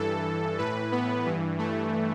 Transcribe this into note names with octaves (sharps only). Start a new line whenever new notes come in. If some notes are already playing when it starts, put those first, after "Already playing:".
Already playing: G2 E3 A4
A2 E3 B4
B3
G2 E3
A3